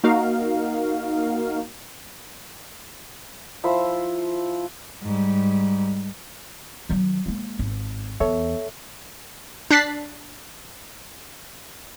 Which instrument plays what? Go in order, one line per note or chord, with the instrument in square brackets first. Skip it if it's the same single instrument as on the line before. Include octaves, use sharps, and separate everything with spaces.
[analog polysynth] A#3 D#4 F#4 A#4 F5
[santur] F3 E4 C5 E5
[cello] G#2 G3
[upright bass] D#3 F#3
G#3 A#3
G#1
[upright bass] E2 [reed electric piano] A4 C#5 E5
[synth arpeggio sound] D4 F#6 A6 B6 C7